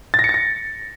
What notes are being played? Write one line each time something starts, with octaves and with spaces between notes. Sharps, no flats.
A6
A#6
C#7
A6
A#6